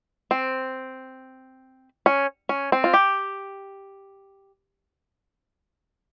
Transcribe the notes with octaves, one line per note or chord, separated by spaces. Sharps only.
C4
C#4
C#4
C4
F4
G4